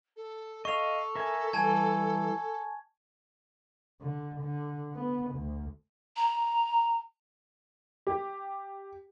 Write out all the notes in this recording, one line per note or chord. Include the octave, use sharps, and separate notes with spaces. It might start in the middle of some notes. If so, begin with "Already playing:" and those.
A4
A4 D#5 F5 C#6 F7
A#4 E5 G#5
E3 G3 G#5 A5 G#6
D3
D3
B3
D2
A#5
G4